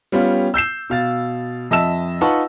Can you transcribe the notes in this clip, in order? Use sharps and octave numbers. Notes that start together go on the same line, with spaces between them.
G3 B3 C#4 F4
E6 G6 C7 E7
B2 F5 A6
F2 D#5 E5 A5 E6 E7
D#4 F4 B4 F#5 A5 C#6